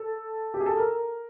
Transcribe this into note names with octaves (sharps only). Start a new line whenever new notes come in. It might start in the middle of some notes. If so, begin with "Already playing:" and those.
Already playing: A4
G4
G#4
A4
A#4